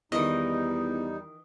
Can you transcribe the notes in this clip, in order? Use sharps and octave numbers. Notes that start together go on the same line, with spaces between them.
E2 D#3 E3 G3 D#4 D#5